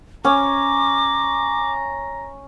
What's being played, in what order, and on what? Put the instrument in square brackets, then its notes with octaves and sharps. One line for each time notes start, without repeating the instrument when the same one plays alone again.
[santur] C#4 [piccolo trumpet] A#5 [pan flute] D6